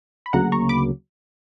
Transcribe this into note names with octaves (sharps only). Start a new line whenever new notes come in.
B5
D2 C#3 F#3 A#3 F#5 A#5
A#5 C#6
B5 D6